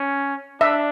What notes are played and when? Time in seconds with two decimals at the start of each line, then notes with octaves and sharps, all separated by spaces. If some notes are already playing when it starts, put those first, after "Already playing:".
Already playing: C#4
0.61 D4 E5